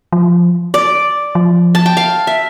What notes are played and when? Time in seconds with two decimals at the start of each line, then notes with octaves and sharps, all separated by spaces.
0.12 F3
0.74 D5
1.35 F3
1.75 A5
1.86 G5
1.97 F5
2.27 E5